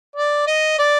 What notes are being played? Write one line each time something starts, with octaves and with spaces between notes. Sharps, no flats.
D5
D#5
D5